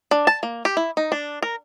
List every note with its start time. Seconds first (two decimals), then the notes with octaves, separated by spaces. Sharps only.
0.11 D4
0.27 A5
0.43 A#3
0.65 G4
0.77 E4
0.97 D#4
1.12 D4
1.43 A#4